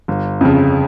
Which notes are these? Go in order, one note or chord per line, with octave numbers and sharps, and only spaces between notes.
G1
F2 C#3